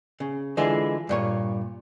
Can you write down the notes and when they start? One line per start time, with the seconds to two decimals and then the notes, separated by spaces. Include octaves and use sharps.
0.20 C#3
0.57 D3 E3 G#3 E4 F4
1.09 G2 A#2 C#5